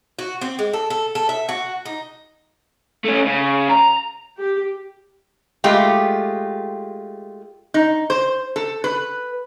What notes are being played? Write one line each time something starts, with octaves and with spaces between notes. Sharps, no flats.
F#4
C4
G#3
A4
A4
A4
E5
F#4
D#4
A3 C#4
C#3
A#5
G4
G#3 A3 F4 G4
D#4
C5
A4
B4